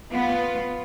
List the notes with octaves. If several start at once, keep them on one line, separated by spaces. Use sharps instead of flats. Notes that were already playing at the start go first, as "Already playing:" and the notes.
B3 F4